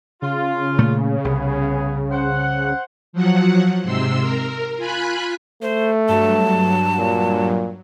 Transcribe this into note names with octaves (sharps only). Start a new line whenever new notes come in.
C#3 F4
A#2 A3
C2 B3 G#4
C5 F#5
F3 F#3 F#5
G#2 C3 C6 E6
A#4
F4 G#5 B5 F#6
A3 C5
G2 F#3 A5
A#2